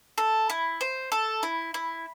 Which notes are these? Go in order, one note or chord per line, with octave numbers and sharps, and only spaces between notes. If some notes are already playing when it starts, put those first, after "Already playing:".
A4
E4
C5
A4
E4
E4